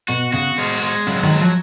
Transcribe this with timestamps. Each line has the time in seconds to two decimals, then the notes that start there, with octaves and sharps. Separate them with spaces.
0.08 B2 F#4
0.33 C#3 F#4
0.58 G#3
0.82 G#3
1.07 C#3 F#3
1.23 D#3
1.31 F#3
1.40 F3